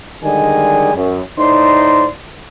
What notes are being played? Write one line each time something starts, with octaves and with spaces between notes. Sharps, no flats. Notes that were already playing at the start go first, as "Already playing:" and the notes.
D3 D#3 G3 G#3 D#5 G#5
F#2
A2 D#4 C5 D5 C6